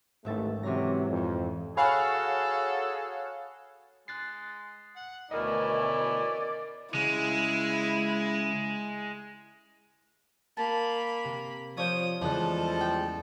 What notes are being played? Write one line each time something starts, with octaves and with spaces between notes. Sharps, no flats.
A1 D#2 G#2 A3 E5 A6
C3 E3 F#3 C#4 A#6
F2
F#4 G#4 A4 C#5 F5 F#5 G#5 B5
G#3 F#6 A6 C7
F#5
D2 B2 E3 C#4 E4 A#4 D5 D#5
C#3 G#3 E4
A#3 A5 B5
C3
F3 C#5 D5 D#6 G6 D#7
E2 C#3 F3 G3 G#3 A4 F#6
G5